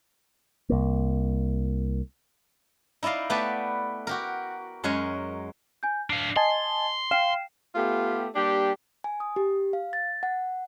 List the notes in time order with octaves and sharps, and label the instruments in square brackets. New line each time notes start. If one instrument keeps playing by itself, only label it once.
[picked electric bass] C2 A#3
[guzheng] D#4 E4 D5 D#5 F5
A3 B3 G4 B4 D5 A5
F#4 G4 A#4
F#2 G#3 A#4 C#5 F#5 G#5
[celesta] G#5 G6
[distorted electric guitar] D4 F5 [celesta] C7
[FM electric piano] D#5 G#5 A5 [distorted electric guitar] C6
[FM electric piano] F5 [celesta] G5 C7 E7
[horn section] A3 B3 F4 G4
G3 A#3 D4 G4
[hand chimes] G#5
D#6
G4
F5
A6
F#5